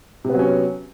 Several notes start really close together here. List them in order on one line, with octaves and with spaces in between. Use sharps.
C3 B3 F#3 C#4